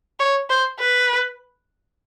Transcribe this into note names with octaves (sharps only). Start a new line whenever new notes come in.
C#5
C5
B4